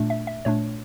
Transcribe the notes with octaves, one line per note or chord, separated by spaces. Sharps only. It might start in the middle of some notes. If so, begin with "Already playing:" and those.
Already playing: A#2 A3 D4
E5
E5
A#2 A3 D4 C#5